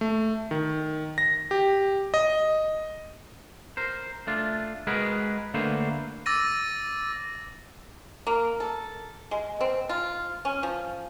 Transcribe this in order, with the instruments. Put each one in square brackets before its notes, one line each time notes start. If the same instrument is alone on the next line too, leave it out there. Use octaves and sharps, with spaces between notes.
[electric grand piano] A3
D#3
A#6
G4
D#5
[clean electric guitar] A#4 C5
A3 D4 F4
G#3 F#4 G#4 A#4 B4
D3 A3 A#3 B4 C5
[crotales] D6 E6 A6 A#6 D#7
[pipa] A#3
A4
G#3
C4
F4
C#4
F3